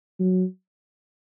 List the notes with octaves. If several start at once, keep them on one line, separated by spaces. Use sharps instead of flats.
F#3